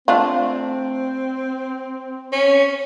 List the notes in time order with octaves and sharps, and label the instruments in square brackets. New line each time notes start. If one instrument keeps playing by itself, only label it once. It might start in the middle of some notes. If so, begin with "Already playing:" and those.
[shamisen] A3 D4 F4 [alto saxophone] C4
[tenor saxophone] C#4